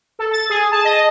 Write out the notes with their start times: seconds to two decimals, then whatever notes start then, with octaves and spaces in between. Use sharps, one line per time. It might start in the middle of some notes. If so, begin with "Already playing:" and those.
0.19 A4
0.33 A6
0.50 G#4
0.72 A5
0.85 D#5